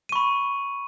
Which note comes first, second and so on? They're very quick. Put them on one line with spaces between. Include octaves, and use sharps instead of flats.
D#7 C#6 B5